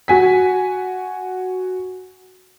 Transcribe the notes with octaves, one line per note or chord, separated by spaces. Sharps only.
F#4 G#5 B6